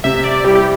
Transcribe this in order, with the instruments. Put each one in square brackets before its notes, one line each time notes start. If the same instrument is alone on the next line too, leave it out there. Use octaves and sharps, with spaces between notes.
[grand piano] C3 [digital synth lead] E5
[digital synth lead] D5
[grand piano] G3 E4 [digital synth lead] G4
[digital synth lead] G4